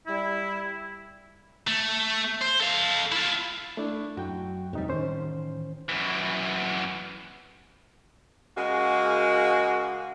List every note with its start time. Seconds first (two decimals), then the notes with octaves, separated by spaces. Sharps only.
0.07 G3 E4
1.67 A3
2.42 C5
2.61 A4 F5
3.12 E4 F4
3.77 A3 D4 E4
4.17 F#2 F#4 G5
4.73 E2 A2 C3 G3 D#4
4.88 A1 D#3 C#4 C5
5.89 F#2 E3
8.56 C#3 G#3 A#3 F#4